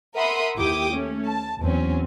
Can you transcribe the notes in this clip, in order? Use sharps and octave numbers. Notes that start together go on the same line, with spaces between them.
A#4 E5 F#5 B5 C6 D#6
D#2 E4 G4 G5 D6 D#6
A3 C#4
A5
E2 F#3 C4 C#4